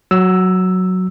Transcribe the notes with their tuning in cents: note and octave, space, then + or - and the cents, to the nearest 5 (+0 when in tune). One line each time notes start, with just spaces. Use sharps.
F#3 +0 E6 +0